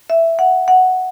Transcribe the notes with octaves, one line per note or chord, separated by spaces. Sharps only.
E5
F#5
F#5